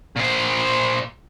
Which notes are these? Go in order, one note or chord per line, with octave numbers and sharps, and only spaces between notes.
A#2 C5